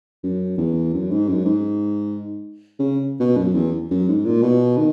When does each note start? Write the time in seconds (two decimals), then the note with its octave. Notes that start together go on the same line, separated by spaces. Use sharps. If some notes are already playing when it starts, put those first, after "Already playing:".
0.24 F#2
0.57 E2
0.94 F#2
1.11 G#2
1.28 F#2
1.45 G#2
2.79 C#3
3.20 B2
3.37 F#2
3.55 E2
3.91 F#2
4.08 G#2
4.25 A#2
4.42 B2
4.77 D#3